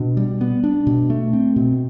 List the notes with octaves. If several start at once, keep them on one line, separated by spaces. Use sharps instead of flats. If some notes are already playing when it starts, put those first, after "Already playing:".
Already playing: B2 D4
G3
B3
D4
B2
A3
C4
B2